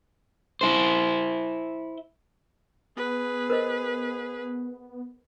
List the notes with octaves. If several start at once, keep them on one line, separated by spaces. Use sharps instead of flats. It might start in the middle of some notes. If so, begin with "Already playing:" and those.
E4 C5
B3 G#4 B4
A#4 C5 D#5